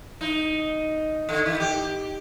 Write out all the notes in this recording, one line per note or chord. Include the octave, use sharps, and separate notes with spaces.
D#4
D3
D#3
G4